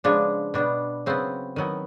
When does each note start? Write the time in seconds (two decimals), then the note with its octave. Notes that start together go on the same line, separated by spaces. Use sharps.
0.04 C#3 F3 G#3 B3 D4
0.54 B2 G3 B3 D4
1.06 C#3 F#3 B3 C4
1.56 D#3 F#3 B3